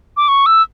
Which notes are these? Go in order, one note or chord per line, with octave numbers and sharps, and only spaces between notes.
D6
C#6
E6